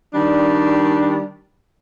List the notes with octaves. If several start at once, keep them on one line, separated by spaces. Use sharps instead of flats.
D#3 G3 D4